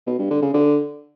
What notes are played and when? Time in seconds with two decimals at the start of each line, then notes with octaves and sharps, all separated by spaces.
0.07 B2
0.19 G2
0.30 D3
0.42 C#3
0.54 D3